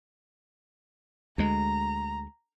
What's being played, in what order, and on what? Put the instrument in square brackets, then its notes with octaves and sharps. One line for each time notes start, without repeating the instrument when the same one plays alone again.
[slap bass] D2 G#3 [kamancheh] A#5